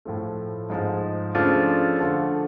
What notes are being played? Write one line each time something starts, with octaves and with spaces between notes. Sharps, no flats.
A2 F3 A3
G#2 F3 G#3
C#3 F3 A3 D4 F4
D3 F3 A3